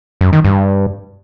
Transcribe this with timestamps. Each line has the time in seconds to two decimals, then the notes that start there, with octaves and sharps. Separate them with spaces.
0.21 F#2
0.33 D#3
0.45 G2